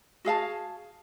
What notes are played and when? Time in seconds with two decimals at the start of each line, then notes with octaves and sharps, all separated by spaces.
0.25 F#4 G#4 F5 A5